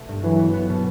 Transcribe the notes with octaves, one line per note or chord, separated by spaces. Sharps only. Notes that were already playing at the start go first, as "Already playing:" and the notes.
Already playing: B2 A3
G2
E3 F#3
B3
B3
B2